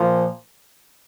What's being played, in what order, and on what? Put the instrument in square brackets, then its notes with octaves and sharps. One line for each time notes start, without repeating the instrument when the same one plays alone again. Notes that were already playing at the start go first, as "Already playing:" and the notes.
Already playing: [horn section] A#2 F3